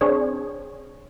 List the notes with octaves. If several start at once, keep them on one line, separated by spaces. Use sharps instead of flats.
C4 D4 G#4 C#5